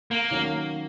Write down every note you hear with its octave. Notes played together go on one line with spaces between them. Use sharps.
A#3
D#3 F#3 C#4